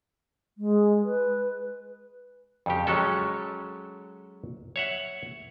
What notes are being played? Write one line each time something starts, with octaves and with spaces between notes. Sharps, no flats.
G#3
B4
F2 C#3 G4
F#3 G#3 C#4 A4
C#5 E5 F#5